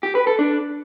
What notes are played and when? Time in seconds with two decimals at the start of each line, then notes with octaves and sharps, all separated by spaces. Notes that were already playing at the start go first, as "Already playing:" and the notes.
0.03 G4
0.15 B4
0.27 A4
0.39 D4